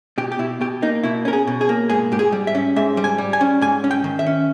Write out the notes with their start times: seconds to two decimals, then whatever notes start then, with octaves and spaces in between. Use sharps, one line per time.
0.18 B2 G4
0.32 G4
0.39 B2 E4
0.61 B2 G4
0.82 A#3 D#4
1.03 B2 E4
1.25 C#4 A#4
1.33 G#4
1.47 B2
1.61 G#4
1.69 A#3
1.89 G#2 G#4
2.12 G#2 G4
2.19 G#4
2.32 G3
2.47 E5
2.55 C#4
2.76 G#2 E5
2.97 G3
3.04 G#5
3.18 G3
3.33 G#5
3.41 C#4
3.61 G#2 G#5
3.84 C#4
3.91 G5
4.04 D#3
4.19 E5
4.26 C#4